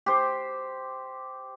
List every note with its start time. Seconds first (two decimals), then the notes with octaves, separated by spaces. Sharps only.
0.06 G4 C5